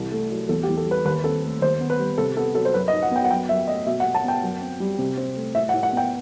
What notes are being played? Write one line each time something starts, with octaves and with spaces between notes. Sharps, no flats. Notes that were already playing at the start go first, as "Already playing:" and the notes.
Already playing: C2 E3
A3
F#3
E2 A4
G4
E2
A4
G3 B4
D#2 B4
C4 A4
A3
D#2 C5
B3
B4
G3
C3 A4
B3 A4
F#3 A4
C5
F#2 B4
D#5
D#4
F#5
B3 G5
F#5
F#2 G5
F#2 E5
A3 D#5
B2 E5
F#5
B2
A5
B3 G5
F#2
C4
G3
C3
C4
A3
A2 E5
F#5
A2
F#5
B3 G5